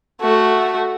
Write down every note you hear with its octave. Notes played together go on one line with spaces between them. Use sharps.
A3 F#4